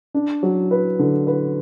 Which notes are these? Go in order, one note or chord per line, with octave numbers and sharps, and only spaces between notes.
D4
F#3
B4
D3
B4